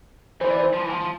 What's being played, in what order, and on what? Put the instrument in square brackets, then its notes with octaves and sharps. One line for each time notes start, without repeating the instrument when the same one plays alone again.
[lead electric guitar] E3 [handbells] C5
[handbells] D5
C5
[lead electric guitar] F3
E3
F3
F3